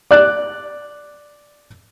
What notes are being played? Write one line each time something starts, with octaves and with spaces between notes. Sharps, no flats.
D5 F#6